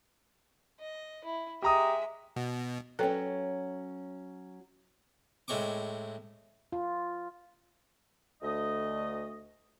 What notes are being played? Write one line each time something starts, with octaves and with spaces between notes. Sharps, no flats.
D#5
E4
G#3 G4 E5 A#5 D#6
B2
F#3 C#4 A4 B4 G5
A2 G#3 C4 C#6 D6
F4
D2 A3 D#5